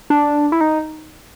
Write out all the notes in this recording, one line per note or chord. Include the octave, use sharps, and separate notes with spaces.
D4
E4
D#4